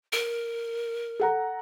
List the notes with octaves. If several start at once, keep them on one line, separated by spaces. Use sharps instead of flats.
A#4
A4 F#5 A#5